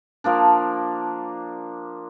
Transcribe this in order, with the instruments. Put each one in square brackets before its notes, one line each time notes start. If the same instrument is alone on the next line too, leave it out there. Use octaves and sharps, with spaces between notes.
[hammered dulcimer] F3 A#3 D4